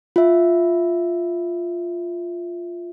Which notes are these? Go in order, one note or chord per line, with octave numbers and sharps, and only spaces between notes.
F4 E5